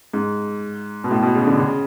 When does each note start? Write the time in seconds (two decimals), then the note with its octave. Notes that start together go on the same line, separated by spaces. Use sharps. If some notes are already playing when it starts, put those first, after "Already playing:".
0.13 G#2
1.04 B2
1.11 A2
1.22 B2
1.35 C#3
1.47 D3
1.59 C#3